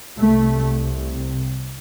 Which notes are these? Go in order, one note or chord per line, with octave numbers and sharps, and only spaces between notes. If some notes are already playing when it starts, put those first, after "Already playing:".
C2 C3 A3